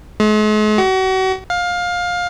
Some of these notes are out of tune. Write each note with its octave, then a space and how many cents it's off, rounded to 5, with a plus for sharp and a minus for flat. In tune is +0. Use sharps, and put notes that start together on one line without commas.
G#3 +45
F#4 +35
F5 +20